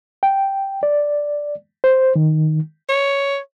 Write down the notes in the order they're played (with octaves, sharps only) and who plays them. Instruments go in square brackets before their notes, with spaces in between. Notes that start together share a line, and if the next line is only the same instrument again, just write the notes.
[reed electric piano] G5
D5
C5
D#3
[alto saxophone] C#5